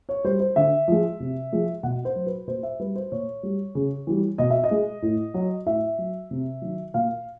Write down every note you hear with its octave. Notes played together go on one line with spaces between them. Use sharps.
C#5
G3 C5
C5
D3 E5
F3 G#3
C3
F3 G#3
B2 F#5
C5
F#3
B4
A#2 C5
E5
G3 B4
C5
A#2 C#5
G3
C#3
E3 G3
B2 D#5
E5
D#5
G#3
A2
F#3
A2 E5
F#3
C3
D#3 F#3
A#2 F5